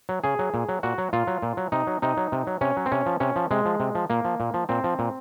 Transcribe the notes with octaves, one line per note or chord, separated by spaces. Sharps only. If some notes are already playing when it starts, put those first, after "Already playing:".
F#3
C#3 G#4
F#3
A#2
F#3
A#2 F#4
F#3
A#2 F4
F#3
A#2
F#3
C3 D#4
F#3
C3 D#4
F#3
C3
F#3
C3 C#4
F#3
C4
C3 C#4
F3
C3 C#4
F3
C3 G#3
F3
C3
F3
A#2 A#3
F3
A#2
F3
A#2 C4
F3
A#2